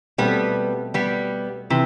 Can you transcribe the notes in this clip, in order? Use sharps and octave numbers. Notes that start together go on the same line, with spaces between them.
B2 G3 A3 B3 C4
G3 B3
C3 E3